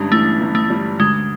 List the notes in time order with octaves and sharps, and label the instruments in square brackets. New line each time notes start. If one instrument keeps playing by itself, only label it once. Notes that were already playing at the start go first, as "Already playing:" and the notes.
Already playing: [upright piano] G1 G2 G3 [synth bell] G#3 C#4
[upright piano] E3 [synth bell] A3
[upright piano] G1
[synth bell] A3
[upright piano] G3
[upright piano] D2 [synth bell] G#3